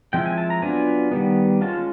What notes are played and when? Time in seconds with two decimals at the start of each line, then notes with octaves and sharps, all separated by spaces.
0.13 F3 G#3 C4 E4 G5
0.26 G#5
0.38 A5
0.50 A#5
0.62 F#3 B3 D4 F4 G#5
1.11 D#3 G3 B3
1.61 G#3 C#4 F4 A5